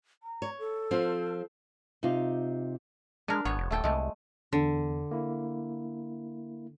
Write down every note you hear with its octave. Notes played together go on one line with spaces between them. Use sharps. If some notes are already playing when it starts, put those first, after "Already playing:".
A#5
C#5
A4
F3 C4 F4
C3 D#4 F4
G#3 D4 A#4
G#1 B3 C#5
F1
D#1 A3 A4 G5
C2 G#3 A3
E2 D3
A#3 E4